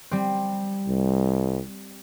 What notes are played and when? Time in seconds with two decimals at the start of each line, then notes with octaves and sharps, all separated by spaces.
0.11 G3 C4
0.87 C2